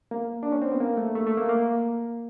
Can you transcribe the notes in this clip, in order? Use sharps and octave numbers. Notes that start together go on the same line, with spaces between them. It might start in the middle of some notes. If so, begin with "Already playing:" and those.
A#3
D4
C#4
C4
B3
A#3
A3
A3
A3
A#3
A#3